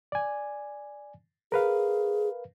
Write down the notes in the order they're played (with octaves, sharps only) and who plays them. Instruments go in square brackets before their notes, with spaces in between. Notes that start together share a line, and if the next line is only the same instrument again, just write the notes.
[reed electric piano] D5 G#5
[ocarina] G#4 [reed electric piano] A#4 B4 F5